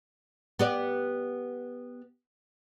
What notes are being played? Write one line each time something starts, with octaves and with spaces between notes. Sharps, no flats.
B3 G4 D5